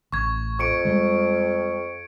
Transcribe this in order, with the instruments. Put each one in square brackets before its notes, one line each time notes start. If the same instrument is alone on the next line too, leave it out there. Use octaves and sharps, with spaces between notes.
[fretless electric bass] A1 [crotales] C#6 G#6
[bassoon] F2 [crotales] C#6 C#7 D7
[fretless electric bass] G3 G#3